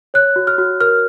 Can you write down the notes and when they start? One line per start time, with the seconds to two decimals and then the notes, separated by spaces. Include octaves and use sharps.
0.14 C#5 F#6
0.36 F#4
0.47 F6
0.58 F#4
0.81 A#4 F6